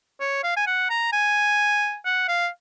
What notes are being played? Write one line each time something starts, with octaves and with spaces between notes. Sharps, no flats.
C#5
F5
G#5
F#5
A#5
G#5
F#5
F5